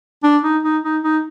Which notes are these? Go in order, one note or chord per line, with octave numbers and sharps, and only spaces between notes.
D4
D#4
D#4
D#4
D#4